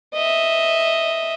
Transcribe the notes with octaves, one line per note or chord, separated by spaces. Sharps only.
D#5 E5